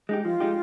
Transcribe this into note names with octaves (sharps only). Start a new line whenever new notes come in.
G#3 D#4 G4
F3 F4
G#3 D#4 G4